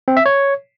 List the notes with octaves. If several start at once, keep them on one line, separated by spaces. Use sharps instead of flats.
C4
E5
C#5